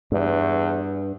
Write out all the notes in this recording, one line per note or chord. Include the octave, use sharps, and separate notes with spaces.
E2 G2